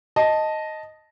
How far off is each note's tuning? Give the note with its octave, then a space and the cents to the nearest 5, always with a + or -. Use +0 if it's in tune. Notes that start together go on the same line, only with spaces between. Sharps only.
D#5 +0 A5 +0